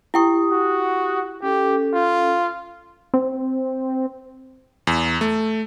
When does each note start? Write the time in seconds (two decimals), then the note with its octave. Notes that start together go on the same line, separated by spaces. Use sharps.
0.14 E4 G4 G5 C#6 D#6
0.51 F#4
1.42 C#4 G4 A4
1.94 F4
3.14 C4
4.87 E2
5.21 A3